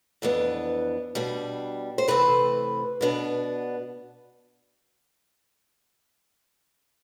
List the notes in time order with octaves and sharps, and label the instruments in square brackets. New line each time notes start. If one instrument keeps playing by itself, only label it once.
[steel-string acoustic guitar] F2 E3 B3 D4
B2 G3 D4
C5
C3 E3 A3 C4 B4
B2 B3 D4